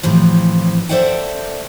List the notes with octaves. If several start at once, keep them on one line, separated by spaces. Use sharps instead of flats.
A2 C3 E3 F3
A4 C5 D5 E5 F#5 G5